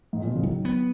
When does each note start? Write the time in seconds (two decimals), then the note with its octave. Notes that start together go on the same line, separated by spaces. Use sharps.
0.13 G#2
0.20 A#2
0.27 B2
0.35 C#3
0.43 D#3 F#3
0.65 B3